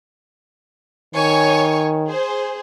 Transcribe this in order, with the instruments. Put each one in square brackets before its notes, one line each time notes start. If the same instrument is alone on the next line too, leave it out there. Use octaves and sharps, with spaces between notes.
[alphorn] D#3 [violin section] C#5 G#5 C#6
[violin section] G#4 C5